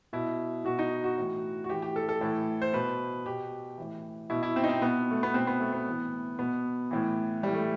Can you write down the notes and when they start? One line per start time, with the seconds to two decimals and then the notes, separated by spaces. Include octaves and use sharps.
0.13 B2 E4
0.65 B2 F#4
0.79 D#4
1.04 F#4
1.18 A2 E3
1.64 F#4
1.69 A2 E3 G4
1.82 G4
1.96 A4
2.09 A4
2.21 A2 E3
2.62 C5
2.73 B2 B4
3.26 B2 G4
3.78 A2 E3
4.30 B2 E4
4.43 E4
4.56 C4
4.64 D#4
4.69 C4
4.82 B2 B3
5.11 A3
5.23 B3
5.34 B2 C4
5.47 B3
5.60 A3
5.73 B3
5.86 A2 E3
6.39 B2 B3
6.91 A2 E3
7.43 A2 E3 G3
7.54 A3